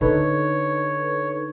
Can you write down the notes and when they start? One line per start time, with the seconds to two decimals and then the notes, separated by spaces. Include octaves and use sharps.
0.01 D3 D#4 A4 B4 C#5